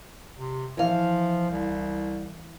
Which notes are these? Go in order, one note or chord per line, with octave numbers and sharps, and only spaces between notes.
C3
E3 F3 F5
C2